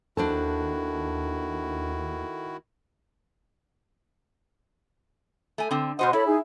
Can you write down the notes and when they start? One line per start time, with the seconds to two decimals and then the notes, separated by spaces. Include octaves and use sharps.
0.17 D#2 D#3 D4 E4 F#4 A4 C5 A5
5.58 A3 G#5
5.71 D3 C4
5.99 B2 F#4 C5 D#5 F#5 C6
6.13 E4 A4 C#5 B5
6.27 D#4 G#4